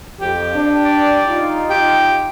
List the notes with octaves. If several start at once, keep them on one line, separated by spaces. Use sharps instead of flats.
F2 G4
D4
D5
D#4 F4
G4 G5